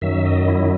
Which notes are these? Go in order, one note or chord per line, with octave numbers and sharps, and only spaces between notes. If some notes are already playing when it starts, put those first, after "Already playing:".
F#2 D#3 F#3 E5
D#5
E4